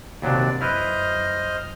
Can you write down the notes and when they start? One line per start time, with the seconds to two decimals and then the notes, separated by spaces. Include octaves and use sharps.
0.22 D#2 C3 F#3 D4 D5
0.61 F#2 E4 B4 C5 D#5 F6